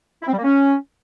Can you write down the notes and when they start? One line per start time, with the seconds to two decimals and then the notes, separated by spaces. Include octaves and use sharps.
0.22 E4
0.28 C4
0.33 G3
0.38 A#3
0.43 C#4